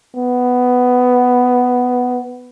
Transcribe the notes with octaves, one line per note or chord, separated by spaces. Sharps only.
B3